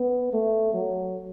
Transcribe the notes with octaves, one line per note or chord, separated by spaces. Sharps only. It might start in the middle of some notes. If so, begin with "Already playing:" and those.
Already playing: B3
A3
F#3